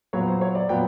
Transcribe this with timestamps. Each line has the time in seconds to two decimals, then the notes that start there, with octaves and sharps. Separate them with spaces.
0.13 A#2 F#3 B3 C#5
0.28 C5
0.41 C#5
0.55 D5
0.69 A#2 F#3 B3 G5